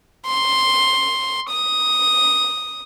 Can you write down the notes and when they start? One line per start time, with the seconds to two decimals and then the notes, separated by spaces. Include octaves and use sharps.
0.26 C6
1.50 D#6